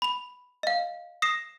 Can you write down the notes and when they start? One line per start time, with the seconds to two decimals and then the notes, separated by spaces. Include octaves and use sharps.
0.02 B5 F7
0.63 D#5 F5
1.22 D#6 A#6 C7 E7